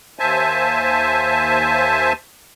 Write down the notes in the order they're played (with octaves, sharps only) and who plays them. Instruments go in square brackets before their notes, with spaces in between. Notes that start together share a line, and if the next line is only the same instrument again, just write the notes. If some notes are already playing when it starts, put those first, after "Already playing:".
[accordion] D#2 C5 E5 G#5 A5